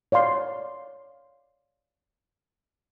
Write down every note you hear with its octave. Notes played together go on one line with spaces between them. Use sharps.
C#5 D5 F5 C6